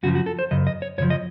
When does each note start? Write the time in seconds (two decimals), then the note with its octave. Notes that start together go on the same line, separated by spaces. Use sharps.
0.03 F#2 C#3 F3 F#4
0.15 F#4
0.26 A4
0.39 C5
0.51 F#2 C#3 D#5
0.67 D#5
0.82 C#5
0.98 F#2 C#3 F3 C#5
1.10 D#5